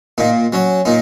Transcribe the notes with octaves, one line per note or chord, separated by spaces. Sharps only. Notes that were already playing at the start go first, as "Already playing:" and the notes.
A#2 D#4
F#3 C#4
A#2 D#4